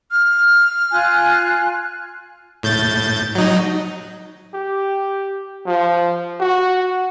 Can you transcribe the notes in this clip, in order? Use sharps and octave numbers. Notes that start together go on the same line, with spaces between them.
F6
F4 G#5 F#6
A2 G6 A6
F#3 D#4
G4
F3
F#4